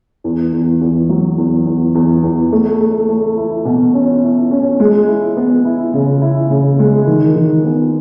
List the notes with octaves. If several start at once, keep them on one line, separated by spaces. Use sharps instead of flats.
E2
E2
E2
F#3
E2
E2
E2
E2
A3
A3
A3
E4
B2
C#4
E4
C#4
G#3
E4
B3
E4
C#3
E4
C#3
G#3
D#3
D#3
B3